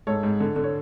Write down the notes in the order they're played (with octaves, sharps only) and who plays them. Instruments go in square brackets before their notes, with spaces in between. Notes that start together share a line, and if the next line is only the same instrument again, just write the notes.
[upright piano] G#2 A4 C#5
G#2
D3
D3
C#5